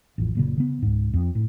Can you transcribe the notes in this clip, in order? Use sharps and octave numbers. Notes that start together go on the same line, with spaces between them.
A1 F2
F#1 A#2 C#3
C#3 B3
C#2 G#2
F2
A2